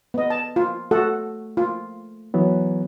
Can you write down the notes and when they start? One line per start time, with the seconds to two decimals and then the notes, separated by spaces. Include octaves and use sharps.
0.14 B3 D#5
0.30 A5
0.56 F4
0.91 A3 F#4 A4 F#5
1.57 F4
2.34 E3 F#3 B3